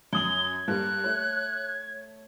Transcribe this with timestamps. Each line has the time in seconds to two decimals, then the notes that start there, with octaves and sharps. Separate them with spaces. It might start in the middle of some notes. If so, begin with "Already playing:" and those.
0.13 F#2 D#6 G#6 F#7 G7
0.68 G2 G3 A#3 F#6
1.04 A3 C#5